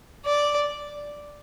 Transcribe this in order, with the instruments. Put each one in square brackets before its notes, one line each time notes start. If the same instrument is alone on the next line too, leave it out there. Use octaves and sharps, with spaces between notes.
[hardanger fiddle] D5